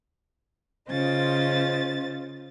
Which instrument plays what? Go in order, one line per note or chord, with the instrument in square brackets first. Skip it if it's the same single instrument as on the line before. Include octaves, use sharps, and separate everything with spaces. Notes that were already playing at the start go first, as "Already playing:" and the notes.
[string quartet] C#3 C#4 F4 C5 D#5 A6